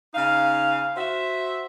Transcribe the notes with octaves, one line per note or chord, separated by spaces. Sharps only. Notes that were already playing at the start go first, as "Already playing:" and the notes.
C#3 D#4 F5
F#4 C5 E5